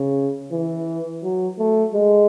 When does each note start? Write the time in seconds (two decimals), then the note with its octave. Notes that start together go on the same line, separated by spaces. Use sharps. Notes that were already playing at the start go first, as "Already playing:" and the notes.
Already playing: C#3
0.52 E3
1.23 F#3
1.59 A3
1.94 G#3